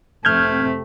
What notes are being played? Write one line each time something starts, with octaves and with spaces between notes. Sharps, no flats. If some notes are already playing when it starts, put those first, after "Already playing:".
F1 C3 A3 C4 F6 G6 G#6